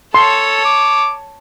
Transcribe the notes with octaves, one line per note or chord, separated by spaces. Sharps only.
A4 C#5 A5 C6
D6